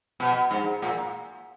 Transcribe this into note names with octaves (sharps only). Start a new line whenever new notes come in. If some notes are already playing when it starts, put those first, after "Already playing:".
B2
G#2
A#2